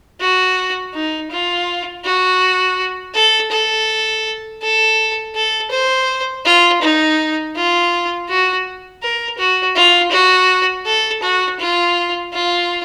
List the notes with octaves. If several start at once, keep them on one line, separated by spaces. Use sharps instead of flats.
F#4
D#4
F4
F#4
A4
A4
A4
A4
C5
F4
D#4
F4
F#4
A#4
F#4
F4
F#4
A4
F#4
F4
F4